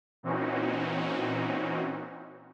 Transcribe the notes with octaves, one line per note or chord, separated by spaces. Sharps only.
A#2 E3 C4 C#4 D#4 F#4